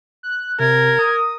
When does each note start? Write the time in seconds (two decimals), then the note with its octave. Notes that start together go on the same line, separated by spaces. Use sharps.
0.23 F#6
0.60 C3 A#4 G#6
0.99 D#6